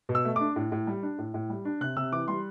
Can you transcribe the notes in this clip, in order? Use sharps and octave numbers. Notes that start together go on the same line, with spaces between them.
B2
E6
A3
D4 D6
A2
A2
G3
D4
A2
A2
G3
D4
C3 F#6
C3 E6
E3 D6
G3 C6